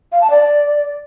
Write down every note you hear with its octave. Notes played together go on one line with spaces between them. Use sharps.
F5
A5
D5